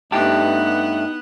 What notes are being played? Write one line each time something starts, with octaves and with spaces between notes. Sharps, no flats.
G2 A3 B3 D#4 G4 E5 F#5 A5